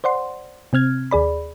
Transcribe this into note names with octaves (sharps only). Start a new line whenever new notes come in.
C5 D5 F#5 C6
C3 C4 F6 G#6
D#2 G#4 D5 B5